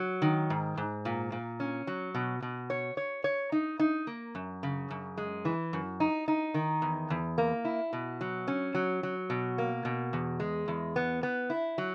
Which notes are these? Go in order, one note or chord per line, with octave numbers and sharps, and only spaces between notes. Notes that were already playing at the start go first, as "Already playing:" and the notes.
Already playing: F#3
D#3
G#2
G#2
A#2
A#2
C#4
F#3
B2
B2
C#5
C#5
C#5
D#4
D#4
A#3
F#2
C#3
F#2
G#3
E3
F#2
D#4
D#4
D#3
E2
E2
A#3
E4
B2
F#3
C#4
F#3
F#3
B2
A#3
B2
E2
G#3
E2
B3
B3
E4
F#3